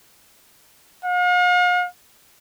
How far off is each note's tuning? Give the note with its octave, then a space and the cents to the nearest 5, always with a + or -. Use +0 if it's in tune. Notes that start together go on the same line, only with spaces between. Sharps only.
F5 +45